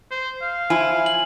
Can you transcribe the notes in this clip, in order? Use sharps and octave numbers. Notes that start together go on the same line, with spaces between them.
C5
F5
F3 E4 G#5
G#5 F#7